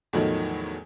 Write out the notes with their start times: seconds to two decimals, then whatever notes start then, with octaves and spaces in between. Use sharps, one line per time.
0.13 E2 A2 D#3 F3 F#3 A3